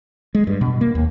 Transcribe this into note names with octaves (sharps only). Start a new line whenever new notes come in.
G#3
G2
B2
A#3
D#2